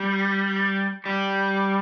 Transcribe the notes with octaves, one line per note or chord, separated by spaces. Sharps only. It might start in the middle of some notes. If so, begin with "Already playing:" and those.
Already playing: G3
G3